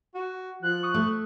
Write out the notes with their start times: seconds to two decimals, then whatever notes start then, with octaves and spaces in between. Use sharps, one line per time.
0.15 F#4
0.62 F3 F#6
0.83 C#6 D#6
0.94 A3